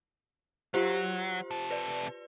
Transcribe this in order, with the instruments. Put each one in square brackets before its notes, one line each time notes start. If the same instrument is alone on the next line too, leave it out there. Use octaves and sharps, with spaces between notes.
[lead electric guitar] F#3 [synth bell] F4 G4 C5
[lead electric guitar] C3 A4
[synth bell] B4 D5